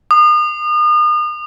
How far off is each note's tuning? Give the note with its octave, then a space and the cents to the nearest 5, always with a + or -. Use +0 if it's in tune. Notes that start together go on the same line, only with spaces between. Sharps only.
D#6 -40